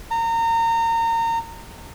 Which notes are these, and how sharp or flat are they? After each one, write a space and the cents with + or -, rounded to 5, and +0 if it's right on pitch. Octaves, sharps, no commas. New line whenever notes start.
A#5 -30